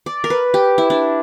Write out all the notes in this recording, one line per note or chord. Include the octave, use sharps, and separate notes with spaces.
D5
A#4
B4
G4
E4
D4